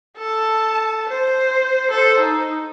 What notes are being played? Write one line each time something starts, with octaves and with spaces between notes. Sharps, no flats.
A4 A5
C5
A4 C5
D#4